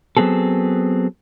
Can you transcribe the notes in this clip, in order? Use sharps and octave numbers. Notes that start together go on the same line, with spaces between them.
F#3 B3 C4 G#4 A4